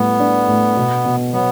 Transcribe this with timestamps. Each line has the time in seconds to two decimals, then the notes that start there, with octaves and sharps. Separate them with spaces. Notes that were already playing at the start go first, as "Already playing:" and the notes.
Already playing: A2 G3 B3
0.20 D4
0.48 A2
0.76 B2
1.05 B2
1.33 F#3 B3